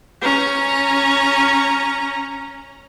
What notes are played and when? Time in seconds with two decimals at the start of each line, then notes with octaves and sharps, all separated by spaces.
0.22 C#4 A#5